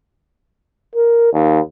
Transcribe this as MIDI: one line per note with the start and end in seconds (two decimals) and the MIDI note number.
0.96 1.29 70
1.33 1.59 39